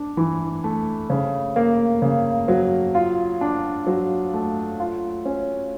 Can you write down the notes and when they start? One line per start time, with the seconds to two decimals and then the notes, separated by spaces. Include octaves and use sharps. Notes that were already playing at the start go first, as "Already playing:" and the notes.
Already playing: D4
0.17 E3
0.64 A3
1.10 C#3
1.56 A#3
2.02 C#3
2.48 F#3
2.95 F4
3.41 D4
3.87 F#3
4.34 A3
4.80 F4
5.25 C#4